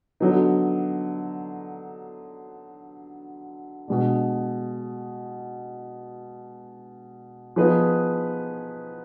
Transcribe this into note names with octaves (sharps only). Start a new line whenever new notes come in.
D3 F#3 B3 D#4
B2 G#3 D4
F3 B3 D#4 G#4 B4